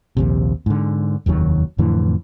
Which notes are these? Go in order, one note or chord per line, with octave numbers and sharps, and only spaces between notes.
A#1 D#2 C3
G#2 D3
F1 D#2 D#3 F#3
F2 A2 D3 E3